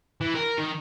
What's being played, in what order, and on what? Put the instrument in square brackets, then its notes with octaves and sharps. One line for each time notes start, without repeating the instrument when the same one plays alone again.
[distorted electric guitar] E3
A#4
D#3